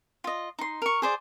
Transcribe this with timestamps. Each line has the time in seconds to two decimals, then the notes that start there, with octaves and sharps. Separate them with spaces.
0.24 F4 D#5
0.59 D#4 C6
0.82 A#4 C#6
1.02 G#4 C5 D5